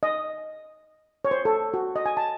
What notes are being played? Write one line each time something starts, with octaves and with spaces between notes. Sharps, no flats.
D#5
C#5
C5
A4
F#4
D#5
G#5
A5